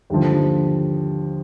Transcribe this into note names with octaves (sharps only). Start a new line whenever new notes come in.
D#2 D3 F3